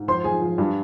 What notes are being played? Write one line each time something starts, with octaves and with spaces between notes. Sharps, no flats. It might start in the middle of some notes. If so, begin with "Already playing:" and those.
Already playing: G#2
F3 C5 C6
F3 G#4 G#5
F3
G2